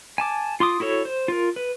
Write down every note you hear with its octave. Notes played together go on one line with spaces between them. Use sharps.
G#5 A5 D6
F4 C6 D6 D#6
E4 F#4 A4 C#5
C5
F4 A#4
B4